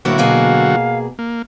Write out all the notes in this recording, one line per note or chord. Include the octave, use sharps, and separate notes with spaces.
A2 D3 F#3 A#3 E4 F#4
B2 A#3 G#4 F5
A#3